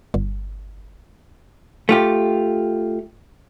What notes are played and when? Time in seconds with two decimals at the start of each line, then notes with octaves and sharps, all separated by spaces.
0.14 G1
1.89 A3 F4 G4